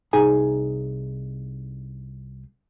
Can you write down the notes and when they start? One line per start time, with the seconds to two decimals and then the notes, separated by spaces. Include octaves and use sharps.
0.13 C2 D#4 G#4 G#5